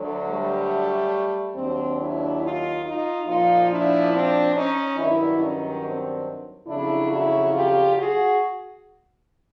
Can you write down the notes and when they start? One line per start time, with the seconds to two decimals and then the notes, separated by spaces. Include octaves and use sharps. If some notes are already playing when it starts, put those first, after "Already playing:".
Already playing: D2 D3 F#3
0.27 G3 A3
1.55 D#2 D#3 F#3 C4 D4
1.98 D4 E4
2.41 D#4 F4
2.83 D#4 F4
3.26 A#2 F3 D#4 F4
3.69 D4 E4
4.11 C4 D4
4.54 C#4 D#4
4.96 G2 D#3 F#3 D4 E4
5.39 C#4 D#4
5.82 C4 D4
6.67 F2 C#3 F#3 D4 E4
7.10 E4 F#4
7.52 F4 G4
7.95 F#4 G#4